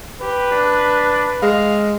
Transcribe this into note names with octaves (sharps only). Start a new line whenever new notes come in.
G4 B4
D4
G#3 F5